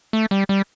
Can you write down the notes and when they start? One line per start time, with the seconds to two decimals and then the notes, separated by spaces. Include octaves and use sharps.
0.13 A3
0.31 G3
0.49 G3